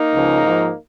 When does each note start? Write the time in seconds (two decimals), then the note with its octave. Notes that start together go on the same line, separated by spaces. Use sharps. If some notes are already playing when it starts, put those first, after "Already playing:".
Already playing: A#3 D#4
0.14 C#2 C#3 F3
0.43 G#2 F3